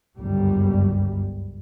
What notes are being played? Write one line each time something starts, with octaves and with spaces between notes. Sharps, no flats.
G1 C#2 F#2 G3